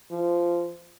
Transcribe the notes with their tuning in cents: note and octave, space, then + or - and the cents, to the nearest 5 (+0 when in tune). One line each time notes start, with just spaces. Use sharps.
F3 -15